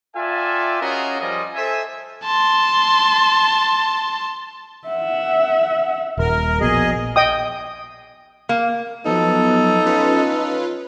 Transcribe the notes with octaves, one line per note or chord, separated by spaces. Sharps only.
F4 A4 D5 E5 G5 G#5
C#4 F4 F#4 G#4 A#4 D#5
F3 G3 F4 G#4 D#5
A4 C5 E5 G#5
A5 C6
E5 F#5
D#1 A#4
A#1 B2 G#4 D#5
D#5 G5 D#6
A#3
F3 F#3 B3 D#4 A4
C#4 F4 B4